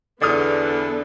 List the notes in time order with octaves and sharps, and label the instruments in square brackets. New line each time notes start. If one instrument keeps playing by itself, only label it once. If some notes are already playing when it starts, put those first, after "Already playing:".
[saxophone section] E2 D3 D4 [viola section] B3 A4 [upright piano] D5 D#6 F6